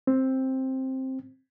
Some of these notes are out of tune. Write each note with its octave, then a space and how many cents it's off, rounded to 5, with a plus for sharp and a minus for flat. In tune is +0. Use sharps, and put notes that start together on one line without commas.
C4 +10